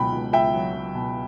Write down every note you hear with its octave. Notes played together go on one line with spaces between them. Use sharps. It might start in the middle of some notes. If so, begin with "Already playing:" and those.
Already playing: C#2 B2 F#3 G5 B5
C#2
C#2 E5 G5
F#3
F#3
B2